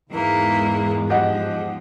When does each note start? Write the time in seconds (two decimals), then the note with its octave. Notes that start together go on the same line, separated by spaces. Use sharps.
0.11 E2 G#2 E3 G#3 A#3
1.10 F3 G4 D#5 F#5